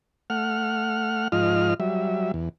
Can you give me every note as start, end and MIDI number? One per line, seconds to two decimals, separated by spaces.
0.30 1.28 57
0.30 1.28 78
0.30 1.28 89
1.32 1.74 44
1.32 1.74 53
1.32 1.74 65
1.32 1.74 75
1.32 1.74 89
1.80 2.32 54
1.80 2.32 55
1.80 2.32 76
2.34 2.49 40